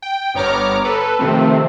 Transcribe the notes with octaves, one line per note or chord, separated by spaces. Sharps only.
G5
G1 B3 C#5 A#5 D6 F6
A4 B4
C3 D#3 F3 A3 C4